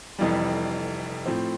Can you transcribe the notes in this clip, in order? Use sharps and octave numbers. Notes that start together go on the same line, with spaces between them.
F1 F2 E3 G3
A2 F3 C4